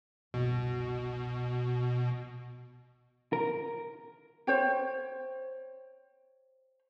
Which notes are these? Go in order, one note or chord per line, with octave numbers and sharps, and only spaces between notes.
F#1 C2 B2
A#4
C5 C#5 G5